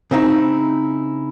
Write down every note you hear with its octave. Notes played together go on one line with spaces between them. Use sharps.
C#3 C4 D#4 E4